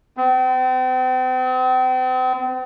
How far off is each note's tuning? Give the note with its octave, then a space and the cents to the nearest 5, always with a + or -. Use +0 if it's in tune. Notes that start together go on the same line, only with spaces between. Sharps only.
C4 -40